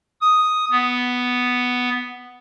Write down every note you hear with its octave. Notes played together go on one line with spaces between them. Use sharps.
D#6
B3